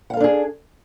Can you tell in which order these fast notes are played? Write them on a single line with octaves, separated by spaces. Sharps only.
F#5 F5 A4 D4 G#4